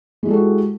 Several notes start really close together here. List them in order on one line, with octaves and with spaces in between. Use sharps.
G#3 E4 G4 A4 F#4